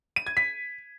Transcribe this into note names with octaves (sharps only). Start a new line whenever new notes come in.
D#7
G#6
B6